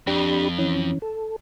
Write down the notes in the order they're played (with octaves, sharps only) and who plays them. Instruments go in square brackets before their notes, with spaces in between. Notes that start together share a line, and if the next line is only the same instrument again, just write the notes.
[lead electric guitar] F2 [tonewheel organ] D4 G4 B5
[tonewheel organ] E3 C#4
A4